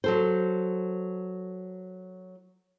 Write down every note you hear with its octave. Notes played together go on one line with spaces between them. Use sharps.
F#3 A4 C5